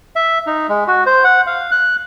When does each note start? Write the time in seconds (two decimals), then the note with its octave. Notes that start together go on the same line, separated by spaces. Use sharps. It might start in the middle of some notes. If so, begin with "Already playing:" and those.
0.16 E5
0.47 D#4
0.69 G#3
0.88 F#4
1.06 C5
1.24 F#5
1.47 F5
1.71 F#6